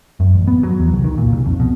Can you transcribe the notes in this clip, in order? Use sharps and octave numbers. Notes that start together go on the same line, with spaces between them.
F#2
A1
B3
F#3
E2
C2
D#3
A#2
C2
F2
B2